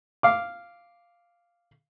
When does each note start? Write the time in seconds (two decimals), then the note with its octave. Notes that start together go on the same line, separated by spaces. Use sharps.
0.23 F5 D6